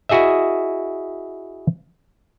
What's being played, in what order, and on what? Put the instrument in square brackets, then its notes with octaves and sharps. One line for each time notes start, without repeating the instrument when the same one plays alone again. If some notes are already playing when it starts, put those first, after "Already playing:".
[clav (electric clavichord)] E4 F#4 G#4 D#5 E5